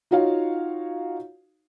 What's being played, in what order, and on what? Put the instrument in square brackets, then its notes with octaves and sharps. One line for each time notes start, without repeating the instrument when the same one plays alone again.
[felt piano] D#4 F4 F#4 C#5 F5